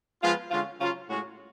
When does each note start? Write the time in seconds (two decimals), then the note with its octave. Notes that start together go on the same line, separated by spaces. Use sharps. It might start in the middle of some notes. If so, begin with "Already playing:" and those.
0.21 F3 G#3 B3 F4
0.51 D3 G#3 C#4 F4
0.80 C#3 F#3 C#4 F4
1.09 A2 G#3 C#4 F#4